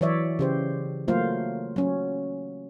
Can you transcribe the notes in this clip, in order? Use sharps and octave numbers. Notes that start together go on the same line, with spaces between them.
E3 F#3 C#5 D5 E5
C#3 G4 C5
F#3 A3 A#3 F4 C5 F5
F#3 C#4